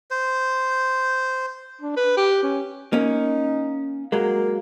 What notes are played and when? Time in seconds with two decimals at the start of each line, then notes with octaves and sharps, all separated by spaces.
0.11 C5
1.81 D4
1.96 B4
2.17 G4
2.43 C#4
2.93 A#3 C#4 D#4
4.12 F#3 G#3 A#3